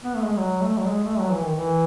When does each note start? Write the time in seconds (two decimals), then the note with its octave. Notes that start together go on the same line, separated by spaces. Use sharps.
0.04 B3
0.15 A3
0.25 G#3
0.37 F#3
0.62 A3
0.78 F#3
0.86 G#3
1.04 A3
1.19 F#3
1.31 E3
1.43 D#3
1.56 E3